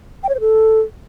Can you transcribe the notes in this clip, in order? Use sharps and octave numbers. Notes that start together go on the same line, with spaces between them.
G5
C#5
C5
A4